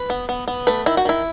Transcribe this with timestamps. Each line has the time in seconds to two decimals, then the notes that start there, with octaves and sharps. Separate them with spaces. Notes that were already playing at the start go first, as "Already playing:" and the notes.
Already playing: B4
0.10 B3
0.29 B3
0.48 B3
0.67 A3 B4
0.86 D#3 E4
0.97 F#4
1.05 D#3 E4